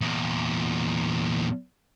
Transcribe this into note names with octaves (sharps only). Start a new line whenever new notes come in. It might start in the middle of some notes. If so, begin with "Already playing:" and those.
E2 A#2